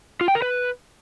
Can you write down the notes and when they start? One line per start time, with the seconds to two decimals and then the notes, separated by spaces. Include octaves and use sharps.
0.21 F4
0.28 G5
0.35 A#4
0.42 B4